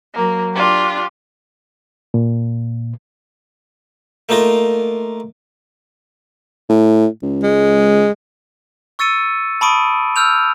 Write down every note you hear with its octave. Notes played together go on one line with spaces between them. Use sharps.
F#3 A#3
D4 F4 G4
A#2
A3 A#3 D#4 F4 A#4
A2
C#2
G#3
C#6 E6 A6 C#7 D#7
A5 B5 C#6 D#6 D7 D#7
E6 F6 G6 F7